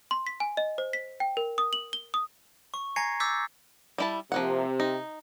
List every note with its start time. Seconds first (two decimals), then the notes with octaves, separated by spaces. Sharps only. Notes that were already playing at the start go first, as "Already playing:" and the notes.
0.11 C6
0.27 B6
0.40 G#5
0.57 D#5
0.78 C5
0.93 B6
1.20 G5
1.37 A#4
1.58 D#6
1.73 F#7
1.93 G7
2.14 D#6
2.74 C#6
2.96 G#5 A#5 G#6 A#6 C7 C#7
3.20 D6 E6 G6 A6 B6
3.98 G3 E4 A5
4.32 C3 F3 A#3 F#5
4.80 D#4